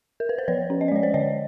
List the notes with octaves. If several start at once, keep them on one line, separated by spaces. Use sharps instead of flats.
A#4
B4
C5
F3 B4 C#5
C#4
D#5
D5
G#3 C#5
C5 D5
D3 C#5 D#5